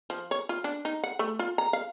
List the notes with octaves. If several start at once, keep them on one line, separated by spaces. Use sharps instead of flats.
F3
C#5
F4
D4
D#4
F#5
A3
F4
A#5
F5